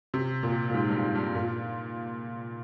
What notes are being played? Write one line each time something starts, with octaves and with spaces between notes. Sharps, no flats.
C3
A#2
A#2
G#2
G2
G#2
G2
A#2